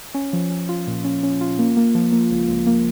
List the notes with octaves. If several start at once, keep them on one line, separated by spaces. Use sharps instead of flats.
C#4
F3
C#4
F4
A#2
C#4
C#4
F4
A#3
A#3
F3
A#3
C#2
C#2
A#3